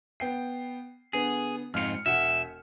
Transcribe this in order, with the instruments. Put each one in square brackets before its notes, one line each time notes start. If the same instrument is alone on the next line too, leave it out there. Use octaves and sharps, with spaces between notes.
[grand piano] B3 G5 C7
[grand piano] D3 B3 [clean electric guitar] G#4
[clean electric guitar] F2 G#2 F4 [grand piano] F6 C#7
[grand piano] E1 F#5 E7 [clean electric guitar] E5